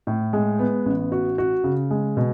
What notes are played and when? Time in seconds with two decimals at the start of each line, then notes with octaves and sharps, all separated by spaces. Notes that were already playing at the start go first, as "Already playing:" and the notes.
0.07 A2
0.33 G#3
0.59 B3
0.86 A1
1.12 F#4
1.38 F#4
1.64 C#3
1.91 G#3
2.17 B2